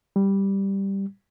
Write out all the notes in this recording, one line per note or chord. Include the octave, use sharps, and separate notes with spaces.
G3